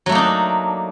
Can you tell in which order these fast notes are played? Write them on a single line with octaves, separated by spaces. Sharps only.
F#3 A3 A#3 D#4 D4